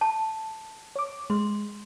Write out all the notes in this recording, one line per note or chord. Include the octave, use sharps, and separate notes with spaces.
A5
C#5 D6
G#3 C6